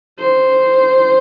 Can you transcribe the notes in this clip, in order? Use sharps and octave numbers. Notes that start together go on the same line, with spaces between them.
C5